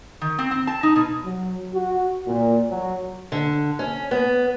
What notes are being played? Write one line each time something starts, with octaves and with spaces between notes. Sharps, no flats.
D#3
C4
C4
A5
D#4
B2
F#3
F#4
A#2
F#3
D3
C#4
B3